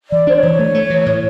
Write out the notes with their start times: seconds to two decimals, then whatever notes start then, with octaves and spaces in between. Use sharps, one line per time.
0.11 E3 D5
0.27 D4 C5
0.35 C#5
0.43 E3
0.59 A3
0.75 A3
0.90 E3
1.06 A2